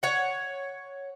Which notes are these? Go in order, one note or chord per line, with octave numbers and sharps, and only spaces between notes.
C#5 F#5